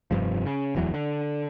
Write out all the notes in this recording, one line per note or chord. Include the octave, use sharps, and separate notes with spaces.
F1 A#1 G2 F3
C#3
D1 E2 E3 F#3
D3